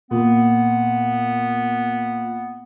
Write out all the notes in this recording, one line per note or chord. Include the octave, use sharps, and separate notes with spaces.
A#2 B3